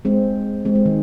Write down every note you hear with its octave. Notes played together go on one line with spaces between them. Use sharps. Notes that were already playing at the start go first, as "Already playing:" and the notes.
G#3 C4
G#3 C4
G#3
D#3